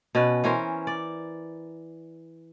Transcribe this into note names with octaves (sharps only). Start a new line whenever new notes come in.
B2 C#4 B4
E3 C#4 A#4 C5
D5